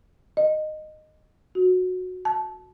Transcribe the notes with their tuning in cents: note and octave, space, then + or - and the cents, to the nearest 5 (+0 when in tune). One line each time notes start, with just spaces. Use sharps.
D#5 -10
F#4 -15
A5 -20